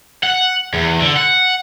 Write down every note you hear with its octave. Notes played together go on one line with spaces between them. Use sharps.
F#5
E2
D3
F#5